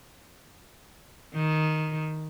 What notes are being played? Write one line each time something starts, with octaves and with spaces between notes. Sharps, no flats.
D#3